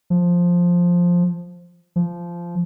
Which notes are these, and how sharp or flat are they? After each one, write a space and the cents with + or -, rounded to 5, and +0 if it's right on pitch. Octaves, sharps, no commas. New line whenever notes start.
F3 +5
F3 -15